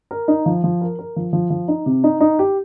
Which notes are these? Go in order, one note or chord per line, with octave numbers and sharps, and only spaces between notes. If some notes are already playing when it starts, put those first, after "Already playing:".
A#4
D#4
F3
F3
A#4
A#4
F3
F3
F3
D#4
C3
D#4
D#4
G4